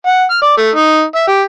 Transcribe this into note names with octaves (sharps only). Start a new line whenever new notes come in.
F#5
F6
D5
A3
D#4
E5
G4